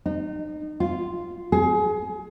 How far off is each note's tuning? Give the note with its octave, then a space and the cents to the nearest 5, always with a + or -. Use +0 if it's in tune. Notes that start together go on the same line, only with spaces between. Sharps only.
D#4 -30
F4 -5
G#4 +30